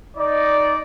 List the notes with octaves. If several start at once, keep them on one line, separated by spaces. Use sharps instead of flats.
D#4 D5